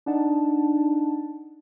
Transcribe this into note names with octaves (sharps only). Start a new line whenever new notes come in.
D4 D#4 F#5 A5